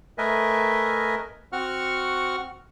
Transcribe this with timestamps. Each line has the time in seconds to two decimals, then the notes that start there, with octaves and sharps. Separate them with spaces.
0.18 A3 A#4 B4 D#5 E5 G#5
1.52 C4 F#4 F#5 C#6 F6